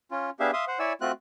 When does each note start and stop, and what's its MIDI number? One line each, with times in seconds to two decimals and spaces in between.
0.11 0.30 61
0.11 0.30 65
0.40 0.51 59
0.40 0.51 62
0.40 0.51 67
0.40 0.51 68
0.40 0.51 76
0.40 0.51 77
0.53 0.65 76
0.53 0.65 77
0.53 0.65 84
0.53 0.65 87
0.68 0.79 72
0.68 0.79 78
0.79 0.93 64
0.79 0.93 73
0.79 0.93 74
0.79 0.93 80
0.79 0.93 88
1.01 1.12 57
1.01 1.12 60
1.01 1.12 65
1.01 1.12 66
1.01 1.12 90